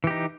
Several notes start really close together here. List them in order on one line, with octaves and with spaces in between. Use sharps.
E3 G4 D#4